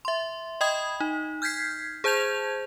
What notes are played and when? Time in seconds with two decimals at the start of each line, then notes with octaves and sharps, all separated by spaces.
0.05 E5 C6
0.61 D#5 G5 B5 D#6 G#6
1.00 D#4
1.42 F6 G6 G#6 B6 C7
2.04 G#4 C5 A5 G6 G#6 F7